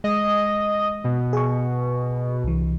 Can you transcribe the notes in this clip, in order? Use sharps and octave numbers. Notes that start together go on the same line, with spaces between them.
G#3 D#5
B2
G#4 C#6
C2 E3